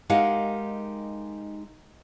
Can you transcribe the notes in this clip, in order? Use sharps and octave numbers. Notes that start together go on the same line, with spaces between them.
G#3 D#4 G4 A#4 F5 F#5